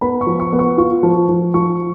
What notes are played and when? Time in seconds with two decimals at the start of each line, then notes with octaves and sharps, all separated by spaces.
0.01 B3 B5
0.21 C#6
0.27 F3
0.40 C#6
0.53 B3
0.59 C#6
0.78 F4 C#6
1.03 F3
1.29 F3
1.54 F3 C#6